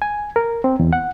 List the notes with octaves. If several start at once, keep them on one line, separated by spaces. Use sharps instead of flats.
G#5
A#4
C4
E2
F#5